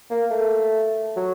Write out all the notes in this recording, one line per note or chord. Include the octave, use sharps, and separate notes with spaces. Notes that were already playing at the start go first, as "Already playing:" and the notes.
A#3
A3
F#3